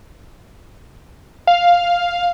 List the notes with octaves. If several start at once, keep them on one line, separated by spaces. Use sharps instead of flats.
F5